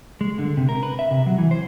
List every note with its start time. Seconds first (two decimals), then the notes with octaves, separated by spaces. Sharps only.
0.21 G#3
0.39 D3
0.57 C3
0.69 A#4
0.83 B4
0.99 E5
1.11 C3
1.26 F#3
1.38 E3
1.51 C5